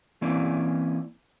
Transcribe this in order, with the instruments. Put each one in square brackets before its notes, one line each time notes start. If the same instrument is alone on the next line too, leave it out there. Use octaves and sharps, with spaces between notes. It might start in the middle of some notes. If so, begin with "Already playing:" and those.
[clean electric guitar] E3 A#3 C4 C#4 E4 D5